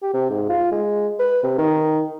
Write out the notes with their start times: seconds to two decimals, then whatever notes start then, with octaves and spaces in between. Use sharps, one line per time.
0.03 G4
0.14 C3
0.30 G#2
0.49 F4
0.71 G#3
1.20 B4
1.43 C3
1.58 D#3